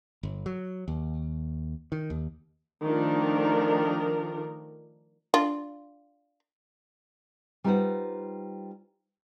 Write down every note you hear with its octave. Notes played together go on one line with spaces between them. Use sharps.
G1
F#3
D#2
D#3
D#2
D#3 F3 A3 D4 A#4
D4 F4
G3 D#4 F4 B4 C5 F#5